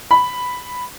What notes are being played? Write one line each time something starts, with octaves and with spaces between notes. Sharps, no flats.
B5